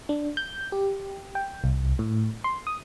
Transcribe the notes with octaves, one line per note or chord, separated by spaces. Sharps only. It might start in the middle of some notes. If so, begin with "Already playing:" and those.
D4
G6
G4
G5
C2
A2
C6
D#6